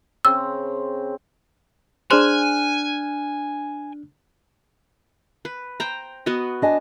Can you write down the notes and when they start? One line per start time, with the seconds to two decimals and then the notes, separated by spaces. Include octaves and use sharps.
0.25 C#3 C4 E6
2.11 D4 G#4 C5 G#5 C6 F6 F#6
5.45 B4
5.80 C5 G5 A#5
6.26 B3 F#4 D#5
6.62 D4 D#5 G#5